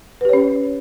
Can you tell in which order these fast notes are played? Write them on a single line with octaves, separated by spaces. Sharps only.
B4 G4 C#5 C#4